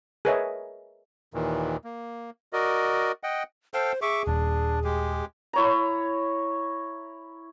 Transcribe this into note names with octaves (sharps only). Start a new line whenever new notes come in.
G#4 A#4 B4 C#5 D#5 E5
D#2 A#2 D#3 E3
A#3
F#4 A#4 D5 D#5
D#5 F#5 G5
A4 C5 F5 G5
G#4 E5 C#6 D6
D#1 D4
G#3 G4
E4 C#5 A#5